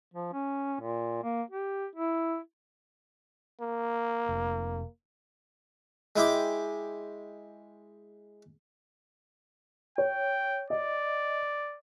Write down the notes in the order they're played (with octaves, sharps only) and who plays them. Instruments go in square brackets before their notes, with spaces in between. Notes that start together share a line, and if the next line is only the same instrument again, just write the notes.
[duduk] F3
C#4
A#2
A#3
G4
E4
[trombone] A#3
[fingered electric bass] F1
[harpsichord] G#3 E4 G5 D6
[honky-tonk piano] C#5 [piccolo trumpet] G5
[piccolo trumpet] D5 [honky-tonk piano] D#5